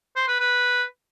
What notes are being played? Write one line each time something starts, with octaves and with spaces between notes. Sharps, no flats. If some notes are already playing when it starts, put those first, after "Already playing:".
C5
B4
B4